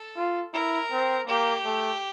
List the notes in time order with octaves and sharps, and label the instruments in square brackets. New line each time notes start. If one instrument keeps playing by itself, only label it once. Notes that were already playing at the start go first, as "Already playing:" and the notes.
Already playing: [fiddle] A4
[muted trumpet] F4
[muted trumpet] E4 [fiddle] A#4
[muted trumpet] C4
[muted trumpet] A#3 [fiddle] G4
[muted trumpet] A3